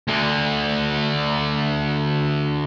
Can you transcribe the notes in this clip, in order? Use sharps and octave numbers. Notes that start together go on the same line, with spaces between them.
D2 D3